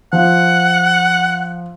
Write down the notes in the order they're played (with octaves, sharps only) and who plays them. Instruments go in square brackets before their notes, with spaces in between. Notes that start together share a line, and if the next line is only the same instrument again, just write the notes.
[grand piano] F3 [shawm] F#5